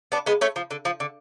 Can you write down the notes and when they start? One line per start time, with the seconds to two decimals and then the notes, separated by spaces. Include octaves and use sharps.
0.12 B3 D4
0.26 G#3 B3
0.41 A3 C#4
0.56 F3
0.71 D3
0.85 F3
1.00 D3